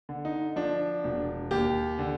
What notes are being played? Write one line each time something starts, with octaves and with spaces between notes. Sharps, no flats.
D3
D#4
F3 D4
E1
D#2 G4
D3